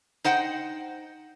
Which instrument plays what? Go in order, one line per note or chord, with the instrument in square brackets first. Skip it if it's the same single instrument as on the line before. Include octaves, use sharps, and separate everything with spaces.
[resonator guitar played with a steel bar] D#4 C5 F#5 G5